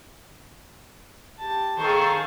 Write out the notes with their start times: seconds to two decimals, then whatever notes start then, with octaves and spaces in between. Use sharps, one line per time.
1.39 G4 A5
1.80 D#3 G#4 A4 C5 F5 C#6